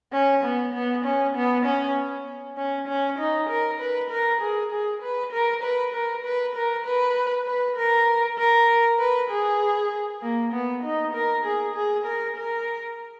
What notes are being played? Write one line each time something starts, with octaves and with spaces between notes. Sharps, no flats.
C#4
B3
B3
C#4
B3
C#4
C#4
C#4
D#4
A#4
B4
A#4
G#4
G#4
B4
A#4
B4
A#4
B4
A#4
B4
B4
A#4
A#4
B4
G#4
A#3
B3
D#4
A#4
G#4
G#4
A#4
A#4